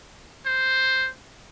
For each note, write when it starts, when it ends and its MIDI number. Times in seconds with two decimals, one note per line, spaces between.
0.46 1.09 72